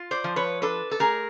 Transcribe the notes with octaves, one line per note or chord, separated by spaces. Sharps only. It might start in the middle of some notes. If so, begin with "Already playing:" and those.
Already playing: F4
C5 D5
F3
B4 C#5
D4 A4 B4
A4
A3 G#4 A#4